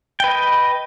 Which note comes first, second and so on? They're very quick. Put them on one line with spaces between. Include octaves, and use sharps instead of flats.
G5 B4 D#5